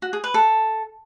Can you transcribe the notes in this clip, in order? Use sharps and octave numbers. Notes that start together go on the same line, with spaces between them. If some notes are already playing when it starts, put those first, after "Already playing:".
F#4
G#4
B4
A4